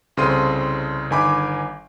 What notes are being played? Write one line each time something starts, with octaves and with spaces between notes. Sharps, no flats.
C2 C#3 C4 A4 C6 D#7
G1 D#3 G#5 B5 D6